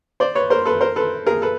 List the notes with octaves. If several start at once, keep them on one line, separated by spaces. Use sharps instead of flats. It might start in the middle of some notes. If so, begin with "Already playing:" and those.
C5 D5
B4 C#5
A#4 C5
A4 B4
A#4 C5
A4 B4
G#4 A#4
A4 B4